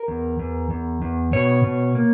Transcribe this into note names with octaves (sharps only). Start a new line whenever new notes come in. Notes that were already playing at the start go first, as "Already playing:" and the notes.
Already playing: A#4
E2
E2
E2
E2
B2 C#5
B2
A#3